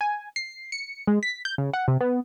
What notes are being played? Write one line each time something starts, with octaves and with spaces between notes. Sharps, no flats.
G#5
C7
C#7
G#3
B6
G6
C#3
F#5
C3
B3